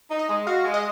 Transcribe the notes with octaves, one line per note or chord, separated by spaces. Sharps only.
D#4
D#5
G#3
F#4 F5
G#3
D#5